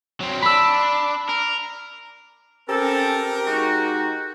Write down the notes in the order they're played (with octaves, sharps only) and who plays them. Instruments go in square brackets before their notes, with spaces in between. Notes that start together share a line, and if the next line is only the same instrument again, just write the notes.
[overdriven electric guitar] F#3 C4
[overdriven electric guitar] D4 [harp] B5 E6
[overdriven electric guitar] A#4
[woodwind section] C4 C#4 A4 [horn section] G4 A#4
[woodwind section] G#3 D#4 F#4